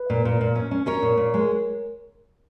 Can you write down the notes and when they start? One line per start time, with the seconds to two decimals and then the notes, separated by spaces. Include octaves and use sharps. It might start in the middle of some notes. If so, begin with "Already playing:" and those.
Already playing: B4
0.10 A#2
0.25 A#2
0.41 A#2
0.55 C#4
0.71 C#4
0.86 C#4 A#4 C#5
1.02 A#2
1.17 A#2
1.34 G#3